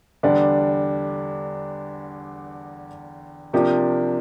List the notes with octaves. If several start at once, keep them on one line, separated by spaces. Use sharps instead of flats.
E2 D3 G3 D4
C3 F3 A#3 D4 G4